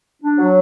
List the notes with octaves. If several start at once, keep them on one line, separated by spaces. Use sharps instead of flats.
D4
F#3